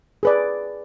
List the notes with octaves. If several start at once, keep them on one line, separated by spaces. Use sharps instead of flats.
G#4 B4 D5